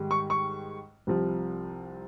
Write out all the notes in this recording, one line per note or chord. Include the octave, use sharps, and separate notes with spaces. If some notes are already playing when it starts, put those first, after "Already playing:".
Already playing: G#2 D#3 G3
C#6
C#6
C2 C3 F3